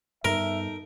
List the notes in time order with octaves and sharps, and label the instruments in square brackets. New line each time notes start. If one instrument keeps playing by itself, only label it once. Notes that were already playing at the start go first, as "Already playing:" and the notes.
[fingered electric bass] G2 G3 B3 [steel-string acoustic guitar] D#4 A4 [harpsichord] A#4 [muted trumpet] E5